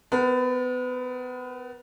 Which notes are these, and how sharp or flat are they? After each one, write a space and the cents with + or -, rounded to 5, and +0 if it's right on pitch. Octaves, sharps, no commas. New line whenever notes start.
B3 +30 B4 -45